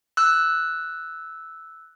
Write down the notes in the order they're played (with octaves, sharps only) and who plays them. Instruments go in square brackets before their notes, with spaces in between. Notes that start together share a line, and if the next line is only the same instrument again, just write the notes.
[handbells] E6 F#6